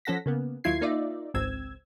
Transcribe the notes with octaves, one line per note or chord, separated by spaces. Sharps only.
F3 C#4 A4 F#5 A#6 B6
C#3 A#3 B3
D#2 F#3 E4 F4 G#6 C7
A#3 D#4 F4 D5 E5
G#1 C#2 C4 E6 G#6